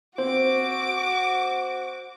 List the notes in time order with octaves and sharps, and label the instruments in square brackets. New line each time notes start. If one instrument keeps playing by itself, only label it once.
[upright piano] C4 [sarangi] F#4 [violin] D6